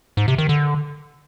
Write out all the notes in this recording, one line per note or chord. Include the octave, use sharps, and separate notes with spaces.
G#2
C3
D#3
D3